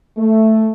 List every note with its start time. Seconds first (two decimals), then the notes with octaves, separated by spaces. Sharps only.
0.17 A3